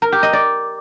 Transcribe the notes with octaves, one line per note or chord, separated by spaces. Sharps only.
A#4
G4
D#5
D5